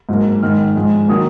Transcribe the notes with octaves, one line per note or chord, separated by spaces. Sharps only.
G#2 F#3 A#3
G#2 D#3 G#3 F6
G#2 F3 G#3
D#3 F#3 A#3 D#6